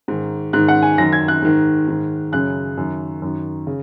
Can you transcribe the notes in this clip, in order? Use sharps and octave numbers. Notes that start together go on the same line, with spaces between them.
G#2 D#3
G#2 D#3 F#6
F#5
G#5
F#2 D#3 A#6
G#6
F#6
G#2 D#3
G#2 D#3
F#2 C#3 F#6
F#2 D#3
F#2 D#3
C#3